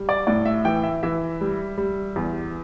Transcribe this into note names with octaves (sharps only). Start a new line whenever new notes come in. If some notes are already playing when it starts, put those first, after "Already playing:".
Already playing: G3
D5
A2 D5
E5
E3 G5
E5
E3 E5
G3
G3
E2